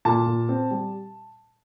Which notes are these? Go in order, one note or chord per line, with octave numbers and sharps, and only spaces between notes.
A#2 A5
A#2
C4
G3